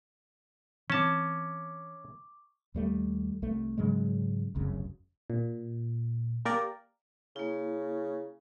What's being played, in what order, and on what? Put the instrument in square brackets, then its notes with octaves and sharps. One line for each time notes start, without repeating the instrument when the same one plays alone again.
[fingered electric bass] E3 C4 [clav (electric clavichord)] C#4 A5 [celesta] C#6 D6
[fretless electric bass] D#2 G3 A3
C2 A3
G#2 C#3 F#3 G#3
F1 C2 F#2 C#3
[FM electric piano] A#2
A#3 G4 A#4 D5
[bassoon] C#3 [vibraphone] A#3 E4